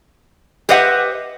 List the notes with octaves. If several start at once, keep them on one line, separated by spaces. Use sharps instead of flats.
G4 B4 C5 D#5 E5 F#5